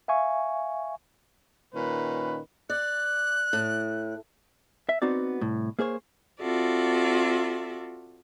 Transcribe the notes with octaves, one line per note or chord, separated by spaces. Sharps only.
E5 F5 G#5 C#6
A#2 D#3 C#4 B4
D5 F#6
A2
E5
B3 C4 D#4 F#4 D5
C2 A2
A#3 G#4 C5 C#5
C4 F4 F#4 A4 D5 E5